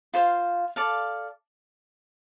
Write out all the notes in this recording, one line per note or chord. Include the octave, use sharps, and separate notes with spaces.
F4 C5 F5
A4 D5 F5 A5